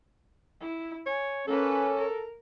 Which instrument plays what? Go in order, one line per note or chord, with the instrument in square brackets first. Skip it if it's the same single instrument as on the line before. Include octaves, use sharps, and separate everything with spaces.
[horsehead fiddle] E4
[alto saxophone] C#5 [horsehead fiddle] G#5
[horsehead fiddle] A#3 B4 [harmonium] C#4 [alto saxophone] A4
[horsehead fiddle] A#4